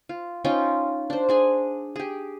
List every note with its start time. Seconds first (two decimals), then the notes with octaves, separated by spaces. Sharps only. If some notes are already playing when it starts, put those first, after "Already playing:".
0.09 F4
0.44 C#4 D#4 F4 G5
1.10 D4 C5
1.29 D4 G#4 G#5
1.96 G4 G#4